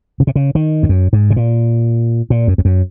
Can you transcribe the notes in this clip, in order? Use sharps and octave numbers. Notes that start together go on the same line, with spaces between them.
C#3
C3
C#3
D#3
F2
F#2
G#2
C3
A#2
A#2
F#2
F2
F#2